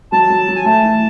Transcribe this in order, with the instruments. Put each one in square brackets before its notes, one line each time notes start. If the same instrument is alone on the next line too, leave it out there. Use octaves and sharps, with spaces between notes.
[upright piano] F#3 [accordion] A5
[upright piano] F#3
F#3
[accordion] G#5
[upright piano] A3 [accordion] A5
[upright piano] E3